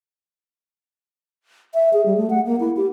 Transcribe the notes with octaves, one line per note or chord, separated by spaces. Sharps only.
E5
G#4
G3
A3
F#5
A#3
E4
G4